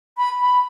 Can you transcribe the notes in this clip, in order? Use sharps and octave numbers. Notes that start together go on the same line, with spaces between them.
B5
B5